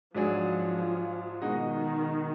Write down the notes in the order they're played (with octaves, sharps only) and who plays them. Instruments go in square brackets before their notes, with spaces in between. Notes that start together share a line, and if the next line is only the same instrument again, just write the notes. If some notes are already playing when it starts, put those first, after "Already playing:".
[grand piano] G#2 F#3 D4 G#4 [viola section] F3
[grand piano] B2 G#3 D#4 F#4 [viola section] D#3